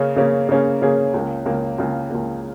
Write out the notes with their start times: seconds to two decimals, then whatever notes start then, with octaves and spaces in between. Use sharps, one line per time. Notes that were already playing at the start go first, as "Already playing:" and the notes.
Already playing: C#3 A#3 C#4 G#4
0.16 C#3 A#3 C#4 G#4
0.49 C#3 A#3 C#4 G#4
0.82 C#3 A#3 C#4 G#4
1.14 C#2 C#3 A#3
1.46 C#2 C#3 A#3
1.78 C#2 C#3 A#3
2.10 C#2 C#3 A#3